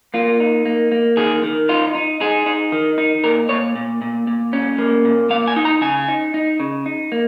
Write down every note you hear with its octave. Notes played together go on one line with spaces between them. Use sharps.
A#3 F4
D#4
A#3
A#3
D#3 G#4
D#3
D#4 F4
D#4
D#4 G#4
D#4
D#3
D#4
A#2 A#4
A#2 C#5
A#2
A#2
A#2
C#4
A#3
A#2
A#3 F5
G#5
D#4
A#5
C#3 G#5
D#4
D#4
C#3
D#4
A#3